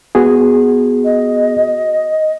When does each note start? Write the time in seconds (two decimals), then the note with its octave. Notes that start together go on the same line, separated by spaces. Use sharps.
0.15 B3 F#4 G#4
1.04 D#5